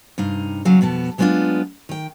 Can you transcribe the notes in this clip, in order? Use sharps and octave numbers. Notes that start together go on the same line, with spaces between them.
G2 C3 D#4 F5
D#2 C#3 F#3 C#5 F5
F2 B2 B3 A5
F#3 G#3 B3 C4 D4 F4
D#3 G5